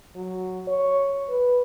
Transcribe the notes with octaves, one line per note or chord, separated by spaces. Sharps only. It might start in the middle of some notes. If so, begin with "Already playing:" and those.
F#3
C#5
B4